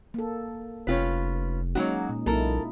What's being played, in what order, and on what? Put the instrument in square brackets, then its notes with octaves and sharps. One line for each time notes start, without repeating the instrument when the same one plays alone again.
[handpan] A#3 A4
[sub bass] F1 [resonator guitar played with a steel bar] C#4 F4 B4
[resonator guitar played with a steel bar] F#3 A#3 F#4 [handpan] G#3 C#4 D#4
[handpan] A#2
[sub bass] B1 [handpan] A#3 D#4 E4 [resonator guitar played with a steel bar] A4 A#4